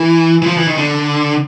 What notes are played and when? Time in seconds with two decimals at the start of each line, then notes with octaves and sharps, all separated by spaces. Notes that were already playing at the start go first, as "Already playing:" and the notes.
Already playing: E3
0.42 E3
0.46 F3
0.57 E3
0.67 D#3
0.77 D3